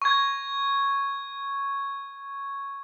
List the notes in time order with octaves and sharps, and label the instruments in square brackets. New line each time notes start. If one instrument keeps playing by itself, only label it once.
[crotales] C#6 G#6